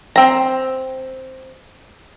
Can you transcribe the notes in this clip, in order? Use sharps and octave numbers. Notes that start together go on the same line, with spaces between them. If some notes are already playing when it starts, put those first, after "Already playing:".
C4 A#5